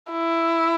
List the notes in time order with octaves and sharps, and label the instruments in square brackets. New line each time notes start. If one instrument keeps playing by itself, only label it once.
[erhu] E4